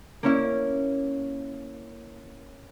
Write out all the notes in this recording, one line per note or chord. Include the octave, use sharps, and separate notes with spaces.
A#3 C#4 E4